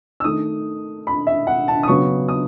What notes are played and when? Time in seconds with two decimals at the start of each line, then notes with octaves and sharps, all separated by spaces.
0.20 E6
0.24 D#3 A3 D#6
1.07 B5
1.27 E5
1.47 F#5
1.68 A5
1.83 D#6
1.88 C#3 F#3 B3 C#6
2.29 D#6